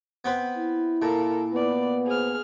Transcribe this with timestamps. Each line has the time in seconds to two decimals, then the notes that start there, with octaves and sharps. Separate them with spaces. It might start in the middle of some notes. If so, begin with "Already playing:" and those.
0.25 B3 C4 B4
0.55 E4
1.02 A#2 A4 A#4
1.53 B3 B4 D5
2.06 G#4 C5 F6